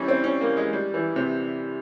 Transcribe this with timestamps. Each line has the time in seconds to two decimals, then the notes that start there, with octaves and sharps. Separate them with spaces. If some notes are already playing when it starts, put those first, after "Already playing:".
Already playing: E3 G3 C#4
0.08 C4
0.24 C#4
0.41 A#3
0.57 G#3
0.73 G3
0.94 E3
1.16 C3